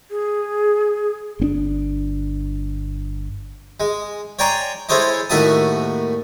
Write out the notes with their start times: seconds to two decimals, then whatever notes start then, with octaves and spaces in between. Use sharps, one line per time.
0.11 G#4
1.40 G1 C4 D4
3.80 G#3
4.39 C#5 D5 G5 G#5 A#5 C6
4.89 G#3 E4 A4 C5 C#5 D#5
5.30 D#2 A2 F#4 E5 A5 D#6